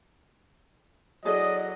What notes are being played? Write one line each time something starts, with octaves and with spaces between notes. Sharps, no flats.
F#3 E4 G#4 A4 D5 D#5